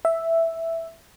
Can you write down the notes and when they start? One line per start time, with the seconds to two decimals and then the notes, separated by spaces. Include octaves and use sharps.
0.05 E5